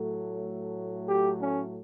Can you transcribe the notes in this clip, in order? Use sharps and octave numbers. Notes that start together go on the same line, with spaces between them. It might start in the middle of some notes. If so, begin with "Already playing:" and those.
Already playing: A2 F#3 A3 A4
G4
C#4